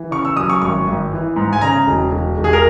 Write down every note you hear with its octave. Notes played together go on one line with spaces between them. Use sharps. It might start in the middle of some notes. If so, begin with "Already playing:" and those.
Already playing: E3
C#3 C#6
E6
F#2 D#6
C#6
G#1 C#6
G#1
E3
G#2
G#5
C#3 A#5
E1
E1
E1
G#4
A#4